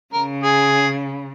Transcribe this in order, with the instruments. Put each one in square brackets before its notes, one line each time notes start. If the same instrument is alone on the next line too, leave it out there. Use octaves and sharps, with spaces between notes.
[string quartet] C#3 [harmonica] A#4
[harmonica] G#4